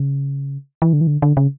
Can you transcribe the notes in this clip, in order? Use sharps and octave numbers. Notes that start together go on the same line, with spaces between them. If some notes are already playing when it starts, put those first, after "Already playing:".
Already playing: C#3
E3
D3
E3
D3
D3
C#3